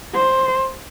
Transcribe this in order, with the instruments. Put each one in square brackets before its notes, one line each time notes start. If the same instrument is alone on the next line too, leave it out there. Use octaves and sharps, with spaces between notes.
[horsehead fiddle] C5